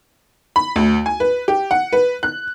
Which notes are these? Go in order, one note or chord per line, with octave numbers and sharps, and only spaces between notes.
B5
D2
G#5
B4
G4
F#5
B4
F#6